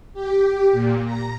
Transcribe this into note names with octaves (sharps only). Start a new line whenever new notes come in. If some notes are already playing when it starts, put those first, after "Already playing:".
G4
A#2
A#5